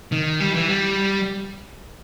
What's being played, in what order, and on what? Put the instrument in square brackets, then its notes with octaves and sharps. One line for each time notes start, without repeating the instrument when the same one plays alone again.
[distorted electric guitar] D#3
G3
E3
G3